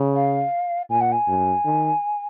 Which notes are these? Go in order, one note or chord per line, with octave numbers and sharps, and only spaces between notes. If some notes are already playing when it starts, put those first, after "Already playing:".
Already playing: C#3
F5
A#2 G#5
F#5
G#5
F#2
D#3